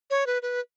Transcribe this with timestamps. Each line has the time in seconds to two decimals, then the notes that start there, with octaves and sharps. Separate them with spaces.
0.10 C#5
0.27 B4
0.42 B4